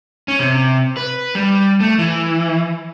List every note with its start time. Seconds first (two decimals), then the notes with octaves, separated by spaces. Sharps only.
0.28 C#4
0.40 C3
0.97 B4
1.35 G3
1.80 A3
1.99 E3